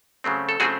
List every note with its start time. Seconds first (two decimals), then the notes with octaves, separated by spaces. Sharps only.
0.24 C#3 F#3 A3 C4
0.49 A4
0.60 C#3 F#3 A3 C4 F#4 G#4